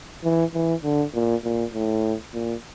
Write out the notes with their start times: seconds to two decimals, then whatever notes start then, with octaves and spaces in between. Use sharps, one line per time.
0.24 E3
0.54 E3
0.84 D3
1.15 A#2
1.44 A#2
1.73 A2
2.33 A#2